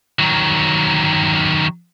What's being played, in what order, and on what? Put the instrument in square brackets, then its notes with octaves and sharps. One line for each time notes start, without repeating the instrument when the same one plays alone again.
[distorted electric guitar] D#3 F#3